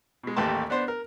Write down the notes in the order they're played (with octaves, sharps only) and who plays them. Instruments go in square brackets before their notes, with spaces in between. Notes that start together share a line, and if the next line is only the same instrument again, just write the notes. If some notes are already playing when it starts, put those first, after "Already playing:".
[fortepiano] B2 G#3
A1 D#2 A3 G4 A5 C6
B3 D4 C5
A#4